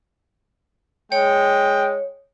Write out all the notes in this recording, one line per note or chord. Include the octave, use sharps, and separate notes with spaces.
G#3 C#5 G5